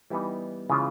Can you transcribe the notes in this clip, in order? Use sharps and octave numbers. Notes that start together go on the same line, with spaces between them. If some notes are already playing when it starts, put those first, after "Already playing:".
E3 G3 B3 D#4
C#3 E3 G#3 C#4 F4